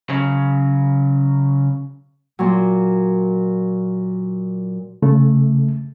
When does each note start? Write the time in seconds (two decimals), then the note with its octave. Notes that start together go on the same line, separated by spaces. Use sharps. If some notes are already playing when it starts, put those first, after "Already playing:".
0.10 C#3 F#3
2.39 A#2 F#3
5.02 C#3 A3